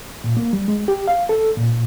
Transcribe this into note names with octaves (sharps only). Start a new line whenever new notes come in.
A#2
A#3
G3
G#3
G4
F5
A4
A#2